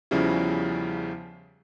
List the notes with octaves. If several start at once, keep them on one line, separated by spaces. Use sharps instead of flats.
E2 C#3 F3 G3 C#4 E4